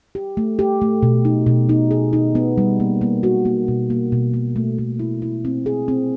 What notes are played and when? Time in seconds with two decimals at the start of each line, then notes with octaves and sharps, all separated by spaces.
0.15 G4
0.37 A3
0.59 G4
0.81 A3
1.03 B2
1.25 D#4
1.47 B2
1.69 D#4
1.91 G#4
2.13 D#4
2.35 B3
2.58 G3
2.80 A#3
3.01 A#3
3.23 F#4
3.45 A#3
3.68 B2
3.90 A#3
4.12 B2
4.33 A#3
4.56 A3
4.78 A3
4.99 E4
5.22 E4
5.45 C4
5.66 G#4
5.88 C4